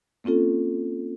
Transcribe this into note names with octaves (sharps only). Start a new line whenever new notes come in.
A#3 C4 C#4 F4 A4